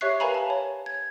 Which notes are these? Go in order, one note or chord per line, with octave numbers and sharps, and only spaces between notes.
G4 C#5 E5 C#6 F#6 C7
A#4 B4 F5 G#5 A#5 B5
A5
C#5
G#6